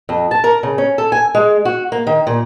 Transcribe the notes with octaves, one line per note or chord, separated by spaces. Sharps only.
F2
A5
A#4
C#3
C#4
A4
G#5
G#3
F#4
A#3
D#3
A#2